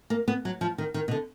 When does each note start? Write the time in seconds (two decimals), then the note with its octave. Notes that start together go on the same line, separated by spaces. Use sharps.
0.10 A#3
0.28 B3
0.45 F#3
0.61 F3
0.78 D#3
0.94 D#3
1.08 B2
1.11 D3